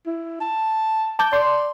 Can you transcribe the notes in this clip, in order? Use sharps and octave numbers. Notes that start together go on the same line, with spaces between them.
E4
A5
A5 D6 G6
D5 C6